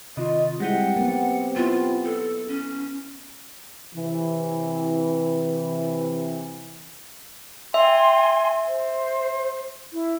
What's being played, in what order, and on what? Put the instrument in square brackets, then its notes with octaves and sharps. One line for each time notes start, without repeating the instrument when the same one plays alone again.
[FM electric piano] C3 D#3 [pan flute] F4 [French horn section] D#5
[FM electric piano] G3 G#3 E4 [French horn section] C4 G4 [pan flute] F#5
[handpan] F#3 B3 [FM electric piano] A#3
[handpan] B3 E4 [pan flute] F4
[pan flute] A4
C#4
[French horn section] C3 E3
[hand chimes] E5 [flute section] G5 G#5 C6
[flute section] C5
E4